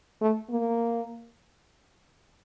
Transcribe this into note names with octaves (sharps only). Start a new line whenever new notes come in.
A3
A#3